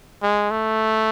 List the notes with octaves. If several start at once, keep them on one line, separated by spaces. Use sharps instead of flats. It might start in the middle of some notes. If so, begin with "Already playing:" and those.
G#3
A3